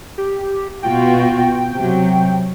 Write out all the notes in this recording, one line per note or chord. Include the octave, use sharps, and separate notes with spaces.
G4
B2 F4 F#4 G5
C3 F#3